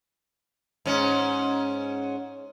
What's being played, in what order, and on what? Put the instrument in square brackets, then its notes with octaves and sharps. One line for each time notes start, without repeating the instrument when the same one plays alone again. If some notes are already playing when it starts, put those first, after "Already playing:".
[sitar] G#2 C#4